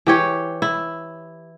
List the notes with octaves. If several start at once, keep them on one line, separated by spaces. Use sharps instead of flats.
E3 G4 C#5
E4